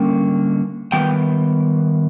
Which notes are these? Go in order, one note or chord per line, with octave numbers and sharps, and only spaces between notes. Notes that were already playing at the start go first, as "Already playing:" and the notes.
Already playing: D3 G3 A#3 C#4 G5
D#3 G3 B3 G5